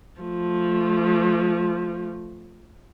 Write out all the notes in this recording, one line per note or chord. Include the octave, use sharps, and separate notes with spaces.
F3 A3